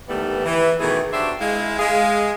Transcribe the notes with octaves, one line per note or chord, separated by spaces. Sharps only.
D#2 D#3 E3 G3 A3 B3
E3
B2 D#3 E3 A3 G#4
D4 F#4 G4 C5 E5
G#3 E4 F5
G#3 G#4 F5